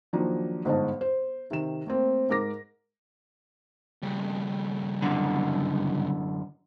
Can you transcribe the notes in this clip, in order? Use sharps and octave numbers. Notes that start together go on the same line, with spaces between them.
D#3 F3 F#3 A#3 D4 D#4
G1 G#2 C5 D#5 A5
C5
C3 D#3 E7
A3 A#3 C4
G#2 A#4 D6 A#6
G2 C#3
F#2 D3